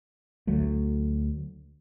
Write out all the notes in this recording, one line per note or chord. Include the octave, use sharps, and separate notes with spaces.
D2 F#3 A3